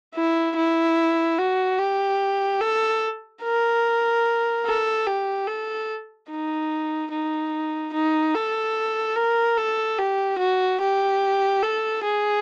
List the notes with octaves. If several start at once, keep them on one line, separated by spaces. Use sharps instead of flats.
E4
E4
F#4
G4
A4
A#4
A4
G4
A4
D#4
D#4
D#4
A4
A#4
A4
G4
F#4
G4
A4
G#4